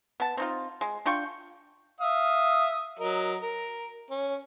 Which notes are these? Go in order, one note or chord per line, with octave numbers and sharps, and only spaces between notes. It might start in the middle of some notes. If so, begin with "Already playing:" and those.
B3 A5
C4 D#4 F4
G#3
D4 F4 G5 C#6
E5 F5 D#6
F#3 A#4 D#5
A#4
C#4